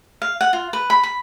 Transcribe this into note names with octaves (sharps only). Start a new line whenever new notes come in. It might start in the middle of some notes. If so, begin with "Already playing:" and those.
F5
F#5
F4
B4
B5
B5